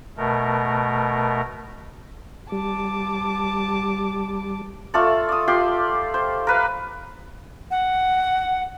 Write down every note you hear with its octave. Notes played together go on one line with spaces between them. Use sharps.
B2 A3 A#4
G3 A5 D6
A3 F4 A4 D5
D5 D#6
F4 G4 D5 C6
C5
A#4 B4 F5
F#5